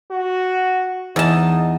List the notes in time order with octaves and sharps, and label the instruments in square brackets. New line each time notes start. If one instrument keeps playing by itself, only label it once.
[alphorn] F#4
[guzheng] E2 A5 [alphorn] D#4